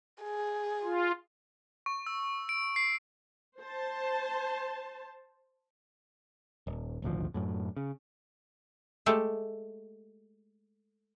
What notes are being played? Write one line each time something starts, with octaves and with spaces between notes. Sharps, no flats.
G#4
F4
C#6
E6
D7
C7
C5 A5
D#1
D#1 G#1 D2 F3
F#2 A2
C#3
G#3 A3 G4 A4